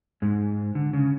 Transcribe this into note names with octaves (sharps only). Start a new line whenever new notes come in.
G#2 G#3
D3
C#3